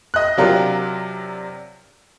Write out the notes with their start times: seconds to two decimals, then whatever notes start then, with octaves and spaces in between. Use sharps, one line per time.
0.14 D#5 F#6
0.37 C3 F#3 D4 F4 G4 A#4